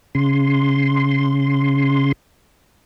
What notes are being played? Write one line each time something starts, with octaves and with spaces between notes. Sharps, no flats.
C#3 C6